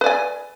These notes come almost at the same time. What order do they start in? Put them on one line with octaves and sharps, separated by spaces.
B4 D5 G#5